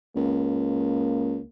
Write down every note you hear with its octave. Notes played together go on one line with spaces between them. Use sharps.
C#2 A#3